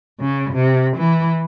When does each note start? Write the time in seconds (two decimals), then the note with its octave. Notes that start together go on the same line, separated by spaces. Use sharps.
0.20 C#3
0.53 C3
0.97 E3